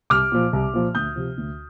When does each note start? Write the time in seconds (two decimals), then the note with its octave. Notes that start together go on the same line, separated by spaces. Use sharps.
0.10 C2 D6 F6
0.32 A#2 F3
0.53 C2
0.74 A#2 F3
0.95 D2 D#6 G6
1.16 C3 F3
1.37 D2